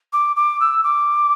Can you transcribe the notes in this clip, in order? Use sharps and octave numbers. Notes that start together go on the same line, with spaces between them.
D6
D6
E6
D6